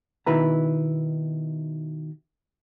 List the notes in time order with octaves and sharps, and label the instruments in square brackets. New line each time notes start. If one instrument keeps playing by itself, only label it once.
[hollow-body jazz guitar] B2 D#3 E4 B4 A#5